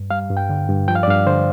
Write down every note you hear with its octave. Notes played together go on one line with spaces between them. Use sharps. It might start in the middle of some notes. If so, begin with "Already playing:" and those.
Already playing: G2
G3 F5
G2
G5
D3
G2
F3 G5
F5
D5
G2 F5
D3 C5